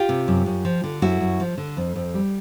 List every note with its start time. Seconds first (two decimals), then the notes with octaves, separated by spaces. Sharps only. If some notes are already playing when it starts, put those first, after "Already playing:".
Already playing: F4 G4
0.09 C3
0.28 F#2
0.46 F#2
0.65 F3
0.84 D3
1.02 F#2 E4 F#4
1.20 F#2
1.40 F3
1.58 D3
1.77 F2
1.96 F2
2.14 G3